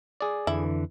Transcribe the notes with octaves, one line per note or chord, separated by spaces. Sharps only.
G#4 D5
F2 D3 E3 E4